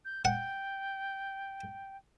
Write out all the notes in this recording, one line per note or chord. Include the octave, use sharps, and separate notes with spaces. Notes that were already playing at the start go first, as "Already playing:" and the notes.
G6
F#5 G5